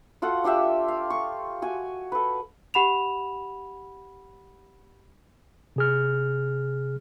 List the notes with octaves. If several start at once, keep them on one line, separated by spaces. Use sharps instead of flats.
F4 F#4 A4 F#5
D4 F4 G4 E5
F5
C#6
F#4 G#5
A4 B4
G4 F#5 B5 E7 F7
C3 G#4 F6